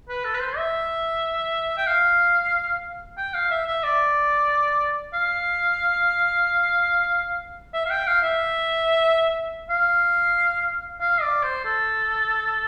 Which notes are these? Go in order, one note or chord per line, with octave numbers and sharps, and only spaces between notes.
B4
A4
B4
C5
E5
G5
F5
G5
F5
E5
E5
D5
F5
E5
F5
G5
F5
E5
F5
F5
D5
C5
A4